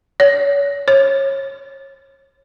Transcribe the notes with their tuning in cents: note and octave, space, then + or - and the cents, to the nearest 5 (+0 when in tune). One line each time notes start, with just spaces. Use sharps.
C#5 +30
C#5 -30